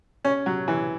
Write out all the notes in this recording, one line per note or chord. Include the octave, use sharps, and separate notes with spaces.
C#4
F#3
E3